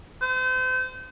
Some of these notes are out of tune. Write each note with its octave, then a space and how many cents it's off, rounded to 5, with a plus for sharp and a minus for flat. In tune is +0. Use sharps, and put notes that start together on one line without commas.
C5 -35